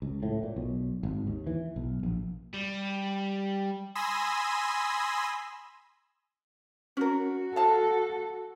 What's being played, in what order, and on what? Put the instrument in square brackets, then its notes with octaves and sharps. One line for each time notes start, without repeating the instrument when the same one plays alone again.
[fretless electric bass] C#2
A2
A#2
B1
G#1
D#2
E3
B1
A#1
[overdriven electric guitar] G3
[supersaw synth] G#5 B5 C6 D#6 E6 A#6
[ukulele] C#4 A#4 [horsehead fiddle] F#4
[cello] A4 [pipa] F5 A5